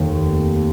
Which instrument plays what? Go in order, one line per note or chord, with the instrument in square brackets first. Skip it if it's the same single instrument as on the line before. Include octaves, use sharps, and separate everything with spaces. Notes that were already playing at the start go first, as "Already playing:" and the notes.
Already playing: [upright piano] F1 D#2 D#3